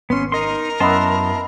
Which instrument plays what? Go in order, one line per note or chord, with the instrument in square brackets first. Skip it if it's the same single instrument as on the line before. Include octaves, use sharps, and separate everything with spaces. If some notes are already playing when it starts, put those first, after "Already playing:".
[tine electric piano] G#1 [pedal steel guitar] B3 C#4 [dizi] C6
[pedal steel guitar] D#4 D#5 C6 [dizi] A#4
[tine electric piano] F#2 D#5 [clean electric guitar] B3 E4 [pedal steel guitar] A5 C6